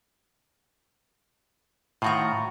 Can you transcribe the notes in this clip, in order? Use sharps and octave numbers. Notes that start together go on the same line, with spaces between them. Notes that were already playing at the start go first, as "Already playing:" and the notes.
A2 D#3 F4 F#4 A#5